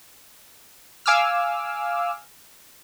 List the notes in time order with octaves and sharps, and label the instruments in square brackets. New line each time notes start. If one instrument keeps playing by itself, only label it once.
[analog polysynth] F5 G#5 D6 E6 F6